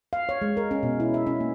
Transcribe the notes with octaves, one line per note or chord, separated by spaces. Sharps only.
F5
C#5
G#3
A#4
C#4
B2
E4
E5
C#4
A#3